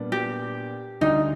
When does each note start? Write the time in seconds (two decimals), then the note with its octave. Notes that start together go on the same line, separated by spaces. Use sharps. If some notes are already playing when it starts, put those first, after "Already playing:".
Already playing: A#2 G3 B3 D4
0.12 G4
1.01 D2 D3 G3 D#4